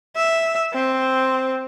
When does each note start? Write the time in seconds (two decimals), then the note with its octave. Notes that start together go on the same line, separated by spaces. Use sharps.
0.17 E5
0.74 C4